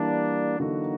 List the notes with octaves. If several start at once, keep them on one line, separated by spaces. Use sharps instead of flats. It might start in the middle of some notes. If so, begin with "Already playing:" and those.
Already playing: E3 G3 A#3 D4
D3 F#3 A#3 D#4 F#4